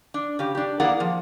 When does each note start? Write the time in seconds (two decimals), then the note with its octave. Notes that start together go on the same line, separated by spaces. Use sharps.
0.14 D4
0.39 C#3 G4
0.55 D4 G4
0.80 A#3 E4 G#4 A#4 D5 F#5
1.00 F3